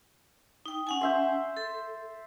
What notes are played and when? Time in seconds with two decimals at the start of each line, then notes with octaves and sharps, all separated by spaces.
0.66 D#4 G5
0.87 C#4 F#5 G#5
1.01 C5 E5 C6
1.57 A4